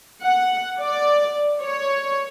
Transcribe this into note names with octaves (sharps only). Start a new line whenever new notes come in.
F#5
D5
C#5